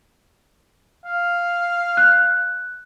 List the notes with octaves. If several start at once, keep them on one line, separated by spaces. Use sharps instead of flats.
F5
F#6